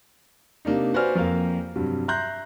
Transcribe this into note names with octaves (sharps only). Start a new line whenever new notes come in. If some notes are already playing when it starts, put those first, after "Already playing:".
C3 A#3 D4 D#4
F#4 B4 C5 D5 G#5 F6
F2 A#3 A#4 F5
G2 C3 F#3
E5 A#5 C6 F#6 G6 A#6